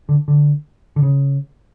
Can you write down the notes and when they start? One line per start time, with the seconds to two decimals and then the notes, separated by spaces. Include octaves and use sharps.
0.09 D3
0.28 D3
0.96 D3
1.03 C#3